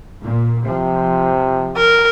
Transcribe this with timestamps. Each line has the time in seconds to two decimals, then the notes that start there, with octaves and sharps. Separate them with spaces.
0.21 A#2
0.65 C3 F3
1.77 A#4